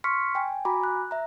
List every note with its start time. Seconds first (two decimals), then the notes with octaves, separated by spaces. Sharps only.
0.04 C6 C#6 F6 B6 C#7
0.35 G5 G#5
0.65 F#4 G#5 A#5 B5 D6
0.84 F#6
1.11 E5 A#5